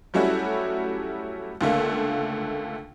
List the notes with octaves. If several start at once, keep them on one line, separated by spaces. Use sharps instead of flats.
F#3 G3 A3 C#4 E4 F#4
C#2 D3 A3 A#3